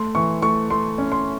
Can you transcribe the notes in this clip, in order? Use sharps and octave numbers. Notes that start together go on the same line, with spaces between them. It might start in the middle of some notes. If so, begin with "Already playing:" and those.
Already playing: A3 C6
E3 C#6
A3 C#6
A3 C6
C#4
C6